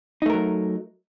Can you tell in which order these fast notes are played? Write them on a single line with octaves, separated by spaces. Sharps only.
D#4 A3 A#4 F#3